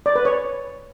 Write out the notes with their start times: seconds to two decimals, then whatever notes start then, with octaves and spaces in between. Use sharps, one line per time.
0.06 D5
0.16 B4
0.25 C#5